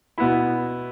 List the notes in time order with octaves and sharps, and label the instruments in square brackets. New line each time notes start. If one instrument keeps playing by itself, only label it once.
[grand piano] B2 B3 E4 B5